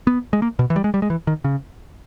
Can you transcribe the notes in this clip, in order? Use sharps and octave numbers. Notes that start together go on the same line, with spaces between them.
B3
G#3
A#3
B2
E3
G3
G#3
G3
G#3
E3
D#3
C#3